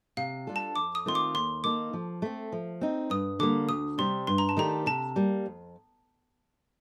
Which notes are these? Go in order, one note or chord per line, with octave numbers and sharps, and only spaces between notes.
C3 F5
G3 D4 F4 A4
A5
F2 D6
D#6
D#3 A3 C4 F4 C6
D6
D#2 C6
D#3 A#3 D#4 A4 D6
F3
A3 C4
F3
C4 D#4
G2 D#6
D3 G3 A#3 D6
D2 D#6
C3 G3 C4 C6
G2 C6
A#5
A5
D#3 A3 D4 G4 A#5
C3 A5
G3 A#3
F2